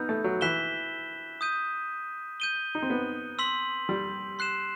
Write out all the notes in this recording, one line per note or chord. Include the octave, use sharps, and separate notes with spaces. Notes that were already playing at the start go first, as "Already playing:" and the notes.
Already playing: B3 D#4 B5 E6 G6
A3
F#3
E3 F#6 B6 E7 G7
D#6 G6 D#7
G6 D#7 G7
D#4
C4
B3
C6 E6 B6 F#7
G3
C6 F#6 C7 E7